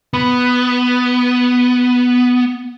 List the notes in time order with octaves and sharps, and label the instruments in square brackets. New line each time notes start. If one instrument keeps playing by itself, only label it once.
[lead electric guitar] B3 [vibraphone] B5